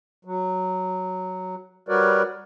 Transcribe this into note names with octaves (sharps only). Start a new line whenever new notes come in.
F#3
G3 F#4 A#4 B4 C#5 D5